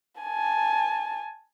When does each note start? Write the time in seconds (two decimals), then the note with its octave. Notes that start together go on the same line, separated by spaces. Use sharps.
0.21 G#5 A5